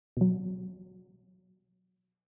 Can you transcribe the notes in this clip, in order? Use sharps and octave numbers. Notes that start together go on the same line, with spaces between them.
B2 F#3